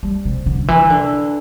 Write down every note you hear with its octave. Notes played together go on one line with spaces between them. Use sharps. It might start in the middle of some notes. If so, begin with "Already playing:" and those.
G3
C3
D3
E3
D3